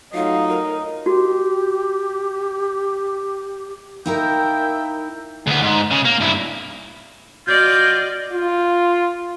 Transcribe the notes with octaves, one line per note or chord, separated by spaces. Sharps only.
F#3 A3 D#4 F4 F5
A#4
F#4 G4
A#3 D#4 E4 A#4 E5 G5
D2 B3
G#2
C#3
A#3
G2 E4
F4 F#4 D5 D#5 G6
F4